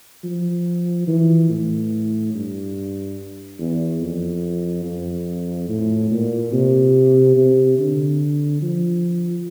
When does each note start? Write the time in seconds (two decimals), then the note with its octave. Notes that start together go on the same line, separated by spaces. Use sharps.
0.24 F3
1.07 E3
1.49 A2
2.34 G2
3.59 E2
4.01 F2
4.85 F2
5.68 A2
6.11 A#2
6.52 C3
7.36 C3
7.78 D3
8.62 F3